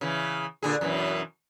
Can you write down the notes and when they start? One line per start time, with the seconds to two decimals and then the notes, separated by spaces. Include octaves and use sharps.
0.01 C#3 E3
0.63 A#2 D3 G#4
0.81 F#2 B2 E3